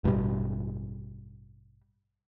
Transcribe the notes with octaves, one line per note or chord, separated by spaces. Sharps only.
A1 G2 B2 G3